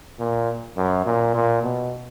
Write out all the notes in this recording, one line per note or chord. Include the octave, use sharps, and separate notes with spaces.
A#2
F#2
A#2
A#2
B2